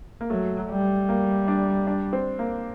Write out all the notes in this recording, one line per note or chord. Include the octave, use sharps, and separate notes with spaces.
A#3
F#3 A3
G3
A#3
D4
D4
C4
A#3